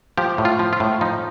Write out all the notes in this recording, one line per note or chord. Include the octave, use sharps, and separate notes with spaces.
F3 G4
A2
F4
F3
F4
A2
F3 D#4